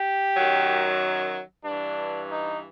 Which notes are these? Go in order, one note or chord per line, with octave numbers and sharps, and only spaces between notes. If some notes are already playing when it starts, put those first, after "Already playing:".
Already playing: G4
F#2 D#3 F#3
G2 E3 D4
D#4